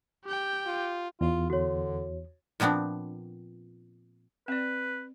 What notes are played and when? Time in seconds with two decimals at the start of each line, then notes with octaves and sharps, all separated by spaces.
0.25 G4 G5
0.66 F4
1.21 E2 F4
1.50 D3 F#4 C#5
2.60 A#2 F3 B3 C4 D4
4.48 C4 B4 D5